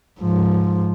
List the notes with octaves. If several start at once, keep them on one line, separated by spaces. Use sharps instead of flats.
G#2 F3